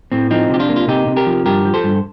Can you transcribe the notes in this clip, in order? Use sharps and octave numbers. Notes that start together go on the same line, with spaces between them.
A2 C4
F3 C4 D#4
C3 G4
D4 F4
A#3
F4
C3 D#4 G4
C3
G4 A#4
F3
G2 G4 A#4
F3
A4 C5
G2